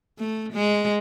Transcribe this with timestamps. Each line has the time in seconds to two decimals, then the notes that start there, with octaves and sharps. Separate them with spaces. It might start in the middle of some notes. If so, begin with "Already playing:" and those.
0.19 A3
0.53 G#3